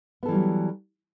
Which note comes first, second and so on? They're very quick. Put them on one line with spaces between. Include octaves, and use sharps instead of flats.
B3 A4 E3 G3 F#3